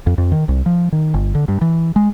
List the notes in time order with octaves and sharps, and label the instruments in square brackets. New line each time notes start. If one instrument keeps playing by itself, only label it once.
[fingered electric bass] F2
F2
D#3
C2
F3
D#3
G1
D3
G2
E3
G#3